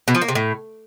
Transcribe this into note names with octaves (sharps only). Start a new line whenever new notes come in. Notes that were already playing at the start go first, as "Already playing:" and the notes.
B2
F3
A#3
C3
A2